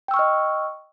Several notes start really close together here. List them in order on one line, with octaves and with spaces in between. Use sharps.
G5 E6 C#6 F6 D#5